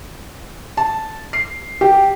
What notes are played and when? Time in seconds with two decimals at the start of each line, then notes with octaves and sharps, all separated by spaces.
0.77 A5
1.33 C7
1.81 G4